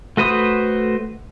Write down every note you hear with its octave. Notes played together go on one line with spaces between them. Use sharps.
A3 F#4 B4 C5 D#6